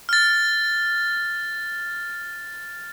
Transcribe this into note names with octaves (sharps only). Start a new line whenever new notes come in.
F6 A6